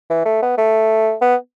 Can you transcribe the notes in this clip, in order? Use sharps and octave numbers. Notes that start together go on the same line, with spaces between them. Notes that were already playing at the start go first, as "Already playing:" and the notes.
E3
A3
B3
A3
B3